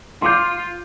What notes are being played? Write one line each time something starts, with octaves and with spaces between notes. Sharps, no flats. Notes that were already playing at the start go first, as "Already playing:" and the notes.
F4 C6 D6 G6